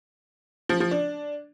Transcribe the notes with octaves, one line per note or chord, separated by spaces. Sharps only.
F3
F3
D4